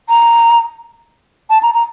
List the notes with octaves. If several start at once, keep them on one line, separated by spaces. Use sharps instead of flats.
A#5
A5
A#5
A#5